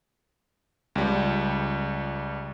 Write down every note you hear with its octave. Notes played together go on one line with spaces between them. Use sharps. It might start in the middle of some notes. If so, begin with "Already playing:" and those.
C#2 G3